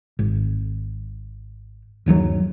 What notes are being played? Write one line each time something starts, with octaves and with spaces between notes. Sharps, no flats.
G#1
G1 D#2 B2 F#3